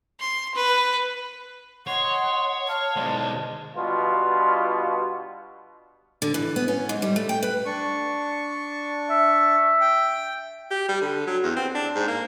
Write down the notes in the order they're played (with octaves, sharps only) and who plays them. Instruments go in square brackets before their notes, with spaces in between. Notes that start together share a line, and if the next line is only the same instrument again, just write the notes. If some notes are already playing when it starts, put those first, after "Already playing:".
[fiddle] C6
B4
[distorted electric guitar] C#5 [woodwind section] D#5 C6 [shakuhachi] F#5
[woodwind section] F5 [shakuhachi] A5
[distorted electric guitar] B1 G#3 [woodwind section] C5 D5
[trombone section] G2 B2 F4
[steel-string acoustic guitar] D3
E3
B3
C#4
G#2
G3
A3
G5
B4
[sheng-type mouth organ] D4 C#6
[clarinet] E5
[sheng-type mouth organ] G5
[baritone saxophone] G4
G3
D3
F#3
E2
C4
D4
G#2
A#3